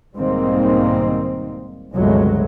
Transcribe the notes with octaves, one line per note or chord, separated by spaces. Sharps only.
B1 G#2 D#3 G3 A#3 C4
G1 C#2 C3 F#3 G#3 A3